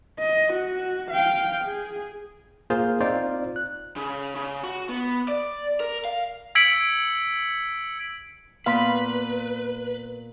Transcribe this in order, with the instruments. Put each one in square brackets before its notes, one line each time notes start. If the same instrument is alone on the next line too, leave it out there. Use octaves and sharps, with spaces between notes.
[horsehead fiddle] D#5
F#4
F5 G5
G#4
[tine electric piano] A#3 F4 G#4 A#4 C5
C4 D#4 F4 C5 D5
F#6
[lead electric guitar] C#3
C#3
F#4
B3
D5
A#4
F5
[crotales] E6 G#6 B6 C#7 D7 F#7
[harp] A#2 B3 C6 [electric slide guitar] B4 [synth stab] F5 B5